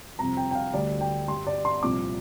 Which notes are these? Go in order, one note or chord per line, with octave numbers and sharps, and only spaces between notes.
F2 C3 G3 A#5
G5
G5
F5
D2 D3 G3 D5
G5
G2 G3 C6
D5
C6
C2 A#2 F3 D6